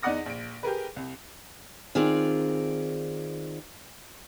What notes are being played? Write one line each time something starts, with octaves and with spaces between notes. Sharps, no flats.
E2 D#4 D5 F#5 D#6 A#6
A#1 D7
G4 G#4 A#4 B4
C2
D#3 C4 F4 G#4 D5